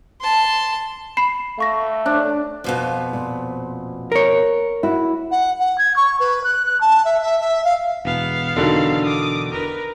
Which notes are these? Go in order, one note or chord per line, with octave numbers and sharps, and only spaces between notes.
A5 C6
B5 C7 E7
A3 F5 C#6 A#6
D4
F2 B2 F3
A#2
A#4 C#5
E4 F#4
F#5
F#5
G#6
C#6
B4
F#6
F#6
A5
E5
E5
E5
F5
E1 B3 F5
E1 D3 D#3 F#3 D4
D6 D#6
A#4 B4